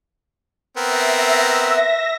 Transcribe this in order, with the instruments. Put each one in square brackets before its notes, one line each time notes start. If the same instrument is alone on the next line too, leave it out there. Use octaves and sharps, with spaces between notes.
[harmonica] B3 C4 A#4 [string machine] E5 A#6